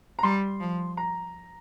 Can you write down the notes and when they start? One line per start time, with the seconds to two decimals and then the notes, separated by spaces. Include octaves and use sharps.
0.19 A#5
0.23 G3 C6
0.60 F3
0.97 A#5